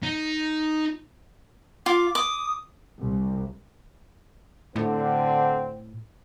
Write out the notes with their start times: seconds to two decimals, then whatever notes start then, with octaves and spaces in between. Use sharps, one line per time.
0.03 D#4
1.86 F4 D6
2.15 D6 D#6
3.01 C2
4.76 A2 D3 C4